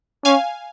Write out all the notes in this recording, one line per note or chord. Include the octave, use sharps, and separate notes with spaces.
C#4 F5 G#5